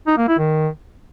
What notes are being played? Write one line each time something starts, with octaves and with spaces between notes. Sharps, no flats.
D#4
A#3
E4
D#3